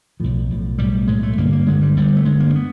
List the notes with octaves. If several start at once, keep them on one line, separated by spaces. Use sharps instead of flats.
B1 A2 F3
B1 A2
B1 A2 G3
B1 A2 G#3
A3
G1 G2 D3 A#3
A#3
G1 G2 D3 G#3
G3
G1 G2 D3 G3
A3
G1 G2 D3 G#3
A#3
B3